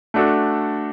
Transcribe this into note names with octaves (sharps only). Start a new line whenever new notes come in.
A3 D4 F#4 A4